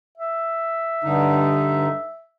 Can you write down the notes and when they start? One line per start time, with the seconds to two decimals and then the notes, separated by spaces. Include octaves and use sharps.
0.18 E5
1.04 G2 D3 D#4